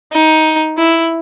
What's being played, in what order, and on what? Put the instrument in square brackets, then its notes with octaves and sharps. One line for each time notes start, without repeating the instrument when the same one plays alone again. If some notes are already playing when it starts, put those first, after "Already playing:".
[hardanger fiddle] D#4
E4